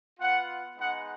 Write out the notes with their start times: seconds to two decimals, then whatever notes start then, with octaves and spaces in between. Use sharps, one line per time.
0.19 B3 F4 F#5
0.77 G#3 B3 D#4 F#5